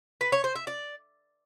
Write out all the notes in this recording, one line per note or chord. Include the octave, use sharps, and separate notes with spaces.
B4
C#5
C5
E5
D5